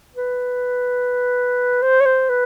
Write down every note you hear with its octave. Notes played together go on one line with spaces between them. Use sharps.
B4
C5
C#5
C5
B4